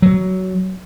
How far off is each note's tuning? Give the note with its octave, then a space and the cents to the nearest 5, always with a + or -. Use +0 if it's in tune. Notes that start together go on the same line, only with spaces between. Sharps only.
F#3 +15